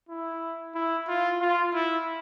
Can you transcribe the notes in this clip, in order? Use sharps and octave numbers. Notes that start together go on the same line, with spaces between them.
E4
E4
F4
F4
E4